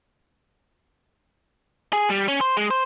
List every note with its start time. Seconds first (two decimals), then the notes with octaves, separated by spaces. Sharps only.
1.93 G#4
2.10 G3
2.28 C#4
2.41 C5
2.57 G#3
2.71 C5